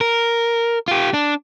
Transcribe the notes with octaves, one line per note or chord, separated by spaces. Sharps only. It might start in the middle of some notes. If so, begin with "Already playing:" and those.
A#4
F4 G4
D4